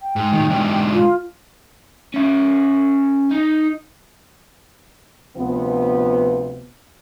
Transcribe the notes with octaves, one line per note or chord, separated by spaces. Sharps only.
G5
G#2
A2 D#3
G#2 D3
F4
C#4 E5
D#4
D2 C3 F3 B3